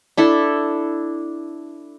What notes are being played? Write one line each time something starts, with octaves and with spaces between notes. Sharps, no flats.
D4 E4 A4